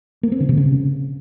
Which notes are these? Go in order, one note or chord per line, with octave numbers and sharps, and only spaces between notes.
A#3
C4
D3
C3
C#3